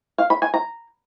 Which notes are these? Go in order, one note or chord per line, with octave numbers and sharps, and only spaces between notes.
F5
B5
G#5
A#5